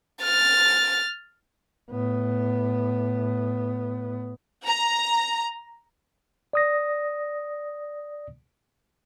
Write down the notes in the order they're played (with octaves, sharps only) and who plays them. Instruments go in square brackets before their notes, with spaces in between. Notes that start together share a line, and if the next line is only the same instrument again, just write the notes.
[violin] F6 A6
[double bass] A2 B3
[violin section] A#5
[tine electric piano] D5 D#6 A#6